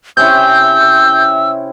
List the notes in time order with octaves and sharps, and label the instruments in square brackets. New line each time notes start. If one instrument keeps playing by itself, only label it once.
[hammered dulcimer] C3 C#4 E4 [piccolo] E6 [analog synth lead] G6